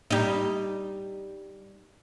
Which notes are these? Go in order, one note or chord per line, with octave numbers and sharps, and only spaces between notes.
G3 D#4